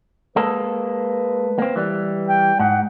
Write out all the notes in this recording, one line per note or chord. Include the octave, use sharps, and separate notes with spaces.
G#3 A#3 A4 B4
A#3 C4
E3 G3
G5
G#2 F#5